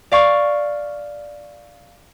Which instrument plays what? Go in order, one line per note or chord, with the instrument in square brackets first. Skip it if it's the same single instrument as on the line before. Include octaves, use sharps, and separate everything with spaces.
[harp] D5 F5 C#6